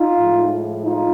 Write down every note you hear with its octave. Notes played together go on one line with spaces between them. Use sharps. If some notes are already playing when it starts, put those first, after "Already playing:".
Already playing: D#4 F4
A2 F3 G#3
D#4 F4